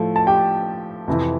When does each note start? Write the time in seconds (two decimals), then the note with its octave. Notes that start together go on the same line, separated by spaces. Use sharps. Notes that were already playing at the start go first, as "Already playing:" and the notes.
Already playing: A2 F3 A3
0.16 A5
0.27 G4 G5
1.08 F2 C3 E3